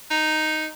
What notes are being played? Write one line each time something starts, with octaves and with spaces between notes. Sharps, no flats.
D#4